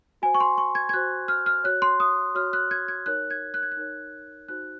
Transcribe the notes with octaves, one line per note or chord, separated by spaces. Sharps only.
F#4 C5 G#5
C#6
C6
C#6
G#6
G#6
F#4 C5 F#6
F6
F6
F#4 C#5 F#6
C6
D#6
F#4 C#5 F6
F#6
G#6
G#6
D#4 A#4 C#5 F#6
G#6
F#6
G#6
F#6
D#4 A#4 C#5
D#4 F#4 C5 F#6